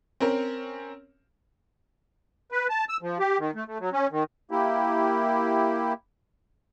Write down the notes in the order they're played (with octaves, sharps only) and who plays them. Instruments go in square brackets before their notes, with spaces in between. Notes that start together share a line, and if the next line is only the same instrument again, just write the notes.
[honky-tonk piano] C4 C#4 A#4
[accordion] B4
A5
E6
F3
G4
D#3
A3
A3
F#3
C#4
D#3
A#3 E4 G4